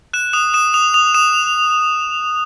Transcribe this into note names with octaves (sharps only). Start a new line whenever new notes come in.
F#6 E7
D#6 E7
D#6 E7
D#6 F7
D#6 F7
D#6 E7